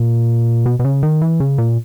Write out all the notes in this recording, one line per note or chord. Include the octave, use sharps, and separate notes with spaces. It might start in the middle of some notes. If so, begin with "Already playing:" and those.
Already playing: A#2
B2
B2
C#3
D#3
E3
C#3
A#2